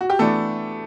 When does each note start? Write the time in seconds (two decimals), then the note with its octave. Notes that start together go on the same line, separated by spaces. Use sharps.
0.01 F#4
0.10 G4
0.19 E3 A3 B3 D4 A4